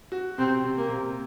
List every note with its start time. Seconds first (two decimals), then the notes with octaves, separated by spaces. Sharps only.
0.12 F#4
0.38 C3 C4
0.64 C3
0.77 A#3
0.89 C3